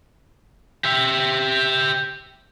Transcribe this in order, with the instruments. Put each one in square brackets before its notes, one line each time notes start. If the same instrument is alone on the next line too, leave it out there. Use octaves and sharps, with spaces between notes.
[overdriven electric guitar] G4 E5